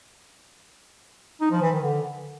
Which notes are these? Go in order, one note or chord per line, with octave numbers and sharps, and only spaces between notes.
D#4
F3
E3
D#3
D3